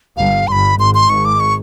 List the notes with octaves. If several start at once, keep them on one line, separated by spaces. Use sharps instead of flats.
G1 G2 F5
G1 G2 B5 C6
G#1 G#2 C6
C6
G#1 G#2 C#6
D6
C#6